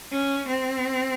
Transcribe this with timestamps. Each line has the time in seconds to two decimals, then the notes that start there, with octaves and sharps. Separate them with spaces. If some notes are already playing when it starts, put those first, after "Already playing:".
0.12 C#4
0.48 C4